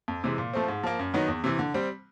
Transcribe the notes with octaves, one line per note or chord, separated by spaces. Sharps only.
F2
C3 E3 G#3
A#2
F3 A3 C4
G#2
F3 A#3
F#2
D#3 F#3 B3 D#4
E2
C3 E3
D3
G3 C4